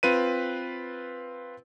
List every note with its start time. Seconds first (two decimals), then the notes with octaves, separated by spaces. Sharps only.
0.03 C4 F4 B4 D#7